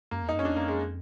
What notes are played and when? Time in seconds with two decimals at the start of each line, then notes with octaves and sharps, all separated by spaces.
0.11 F#2 A#3
0.23 E2
0.29 D#4
0.34 F#2
0.39 C#4
0.42 F2
0.45 D4
0.49 E2
0.56 F2 A#3
0.68 G#3